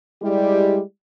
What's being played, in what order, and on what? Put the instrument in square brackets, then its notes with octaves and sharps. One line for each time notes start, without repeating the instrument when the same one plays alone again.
[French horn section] G3 G#3 E4 G4 D5